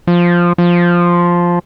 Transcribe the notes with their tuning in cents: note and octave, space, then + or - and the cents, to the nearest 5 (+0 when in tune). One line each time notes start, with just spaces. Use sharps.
F3 +0
F3 +0